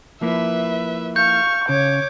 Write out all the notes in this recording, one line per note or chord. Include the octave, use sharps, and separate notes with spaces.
F3 A#3 E4 B4 E5
F5 C#6 G6
C#3 C#5 D6